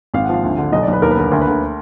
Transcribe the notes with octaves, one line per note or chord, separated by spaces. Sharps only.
G#1 F5
F3 F#5
F5
D2
D3
B1 D#5
B1 D5
B4
D#2 A#4
B4
D3 A#4
D2 A#4
B4
D2 A#4